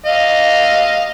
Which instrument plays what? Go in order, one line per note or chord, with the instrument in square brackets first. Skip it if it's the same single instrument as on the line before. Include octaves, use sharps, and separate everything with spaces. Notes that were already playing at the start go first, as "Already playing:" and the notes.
[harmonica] D#5 F5